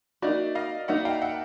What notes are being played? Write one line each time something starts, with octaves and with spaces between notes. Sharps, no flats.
A#3 D#4 F#4 D5 E5
D#5 F5
A#3 D#4 F#4 E5 F#5
F5 G5
E5 F#5